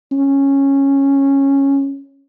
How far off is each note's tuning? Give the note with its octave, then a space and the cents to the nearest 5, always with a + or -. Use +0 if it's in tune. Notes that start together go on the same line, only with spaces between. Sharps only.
C#4 -10